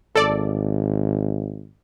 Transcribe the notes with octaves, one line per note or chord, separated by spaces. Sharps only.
G#1 A4 D5